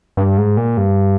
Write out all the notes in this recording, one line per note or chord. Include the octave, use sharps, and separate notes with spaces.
G2
G#2
A#2
G2